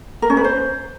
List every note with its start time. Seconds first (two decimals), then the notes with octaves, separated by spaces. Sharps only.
0.22 A#4
0.30 C#4
0.37 B4
0.44 C5